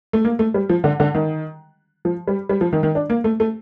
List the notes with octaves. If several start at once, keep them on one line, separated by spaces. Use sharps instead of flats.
A3
A#3
A3
G3
F3
D3
D3
D#3
F3
G3
G3
F3
D#3
D#3
D4
A#3
A3
A3